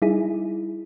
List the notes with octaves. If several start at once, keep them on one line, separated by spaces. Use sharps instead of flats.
G3 D#4 E4 G#4